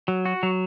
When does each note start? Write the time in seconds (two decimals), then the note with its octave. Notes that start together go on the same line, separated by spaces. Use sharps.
0.08 F#3
0.25 F#4
0.43 F#3